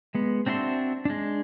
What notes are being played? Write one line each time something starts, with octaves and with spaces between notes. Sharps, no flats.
G#3 B3
C4 D4 F#4 E5 C6
G#3 D4